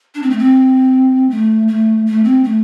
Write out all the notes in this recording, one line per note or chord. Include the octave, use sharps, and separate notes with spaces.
D4
C4
A3
C4
A3
A3
A3
C4
A3